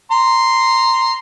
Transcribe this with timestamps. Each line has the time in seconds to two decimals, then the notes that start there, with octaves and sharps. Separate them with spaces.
0.11 A#5 C6